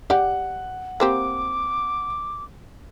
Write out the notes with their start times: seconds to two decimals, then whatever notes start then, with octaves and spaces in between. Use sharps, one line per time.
0.10 G4 D5 F#5
1.00 A#3 C4 G4 D6